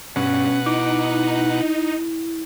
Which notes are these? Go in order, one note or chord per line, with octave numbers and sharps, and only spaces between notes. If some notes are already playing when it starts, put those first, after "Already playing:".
G2 B2 C#4 F#5
D#4 E4 D6